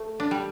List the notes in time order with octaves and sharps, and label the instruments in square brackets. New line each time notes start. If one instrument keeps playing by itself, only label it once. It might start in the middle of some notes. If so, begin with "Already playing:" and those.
Already playing: [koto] A3
D4
G3